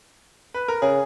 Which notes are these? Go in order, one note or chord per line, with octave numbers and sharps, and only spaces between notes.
B4
A#4
C#3 G#4